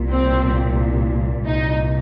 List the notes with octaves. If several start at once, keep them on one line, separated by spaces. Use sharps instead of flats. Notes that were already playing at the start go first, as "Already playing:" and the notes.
Already playing: C2 A#2
C4
C2 A#2 D#4